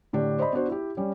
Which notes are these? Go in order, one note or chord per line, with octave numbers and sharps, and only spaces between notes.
A2 D3 D4 G4
C5 D5 D#5 B5
B3 D4 F#4 C5
E4 G4
G3 C#4